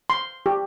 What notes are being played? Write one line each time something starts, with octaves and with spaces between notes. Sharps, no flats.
C6
G4